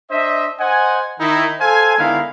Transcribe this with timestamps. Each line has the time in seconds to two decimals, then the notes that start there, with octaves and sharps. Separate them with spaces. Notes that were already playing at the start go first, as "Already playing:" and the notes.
0.11 D4 C5 D#5 E5
0.60 C5 D#5 F#5 G#5
1.20 D#3 D#4 E4
1.60 A4 C5 F5 G#5
1.98 D3 D#3 G#3 B3 E4 F5